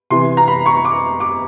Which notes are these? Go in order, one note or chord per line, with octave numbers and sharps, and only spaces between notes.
C3 E3 C6
A#5
B5
C#6
D6
D6